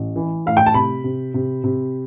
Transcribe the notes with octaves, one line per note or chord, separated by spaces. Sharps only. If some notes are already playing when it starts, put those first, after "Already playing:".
Already playing: A1
E3
A2 F5
G5
A5
C3 B5
C3
C3
C3